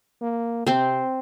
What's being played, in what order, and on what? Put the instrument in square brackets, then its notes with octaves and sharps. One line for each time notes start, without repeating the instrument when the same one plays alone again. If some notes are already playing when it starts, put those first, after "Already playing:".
[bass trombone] A#3
[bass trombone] C3 [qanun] C4 C5